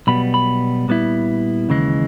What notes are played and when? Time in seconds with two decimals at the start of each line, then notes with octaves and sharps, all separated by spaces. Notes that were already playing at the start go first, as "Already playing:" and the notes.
0.07 B1 B2 G3 B3 B5
0.34 B5
0.88 A#2 G3 B3 E4
1.69 D#2 C#3 E3 G#3